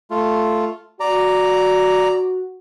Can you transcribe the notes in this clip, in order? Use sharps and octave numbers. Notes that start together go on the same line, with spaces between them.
A3 F4
F#4 D5 A#5